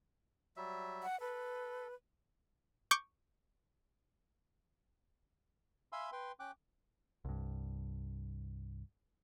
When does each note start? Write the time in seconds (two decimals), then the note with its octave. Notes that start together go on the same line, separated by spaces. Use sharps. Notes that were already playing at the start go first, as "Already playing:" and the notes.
0.57 F#3 G3 E5
1.03 F#5
1.20 A4 B4
2.91 C#6 D6 G6
5.92 E5 F5 G#5 B5 C6 E6
6.12 B4 G5 C6
6.40 C#4 G5 D6 F#6
7.25 C2 G2